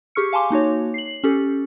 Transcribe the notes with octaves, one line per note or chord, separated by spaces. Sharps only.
G4 G#4 C#6 F6 C#7
F5 G#5 A5 C6 D6
A#3 D#4 F#4 C#5
C7 F#7
C#4 G4 A4